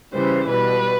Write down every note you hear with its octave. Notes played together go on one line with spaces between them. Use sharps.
C#3 E3 G3 C5
B2 G3 B4